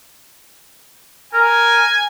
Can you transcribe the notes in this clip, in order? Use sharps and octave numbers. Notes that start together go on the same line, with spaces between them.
A#4 G#5